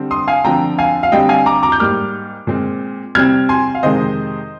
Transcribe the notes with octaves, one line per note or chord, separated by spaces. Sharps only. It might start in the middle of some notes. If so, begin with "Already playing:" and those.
Already playing: D3 G3 C4
C6 D#6
F5 G#5
D3 F3 C4 G5 A#5
F5 G#5
F5
D3 G3 C4 D#5 G5
F5 G#5
A#5 D6
A#5 D6
G6
G#2 G3 A#3 D6 F6
A#2 G#3 C4
C3 G3 C4 F6 G#6
G#5 C6
F5
F2 C3 D#3 G#3 C4 C5 D#5